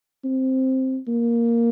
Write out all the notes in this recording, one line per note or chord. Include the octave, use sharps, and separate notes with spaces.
C4
A#3